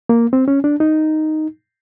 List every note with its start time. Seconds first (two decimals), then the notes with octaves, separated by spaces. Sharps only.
0.09 A#3
0.33 C4
0.48 C#4
0.64 D4
0.80 D#4